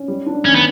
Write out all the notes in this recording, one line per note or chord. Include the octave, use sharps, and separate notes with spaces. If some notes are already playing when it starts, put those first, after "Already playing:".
Already playing: C#4
G3
D4
D#3 C#4
B3